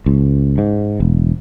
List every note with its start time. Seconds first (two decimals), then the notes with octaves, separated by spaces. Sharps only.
0.06 C#2
0.58 G#2
1.00 E1